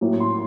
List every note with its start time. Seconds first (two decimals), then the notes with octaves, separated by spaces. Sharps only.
0.01 A2 F#3 A#3 C#4
0.20 C6